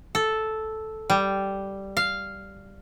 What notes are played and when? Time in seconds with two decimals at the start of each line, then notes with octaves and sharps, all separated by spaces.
0.15 A4
1.10 G3
1.97 F5